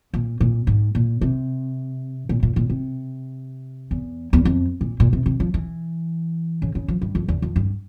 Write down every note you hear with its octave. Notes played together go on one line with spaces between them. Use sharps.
A#2
A#2
G#2
A#2
C3
A#2
A#2
A#2
C3
E2
E2
F2
A#2
A#2
C3
C3
F3
E3
C#3
C#3
F3
G2
F2
E2
F2
G2